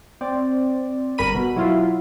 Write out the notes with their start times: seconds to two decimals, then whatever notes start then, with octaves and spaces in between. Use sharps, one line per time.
0.21 C4 D5
1.18 G1 A#4 B5 D#7
1.34 B2
1.56 F#3 E4 F4